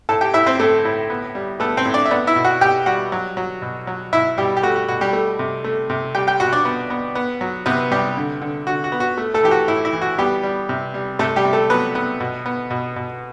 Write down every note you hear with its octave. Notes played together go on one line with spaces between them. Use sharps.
A2 A4 A5
G4 G5
A2 E4 E5
C4 C5
A2 A3 A4
A2
B3
G3
A3 B3 A4
C4 C5
A2
D4 D5
E5
B3 D4 D5
E4 E5
B2
F#4 F#5
B2 G4 G5
G3 F#4 F#5
F#3
F#3
B2
F#3
B2 E4 E5
B2 G3 G4
G4
A3 F#4
F#4
B2 F#4
G3 G4
A3
C3
A3
C3
G3 G4 G5
G4 G5
B2 F#4 F#5
D4 D5
B3
B3
B3
F#3
C3 B3 B4
C3 G3 G4
D3
D3
D3 F#4
F#4
B3
F#4
A3
A3 A4
E3 G4
F#4
A2 E4
E4
E3
F#4
G3 B3 G4
G3
C3
G3
C3 A3 A4
G3 G4
C3
A3 A4
F#3 B3 B4
B3
B2
B3
B2
B2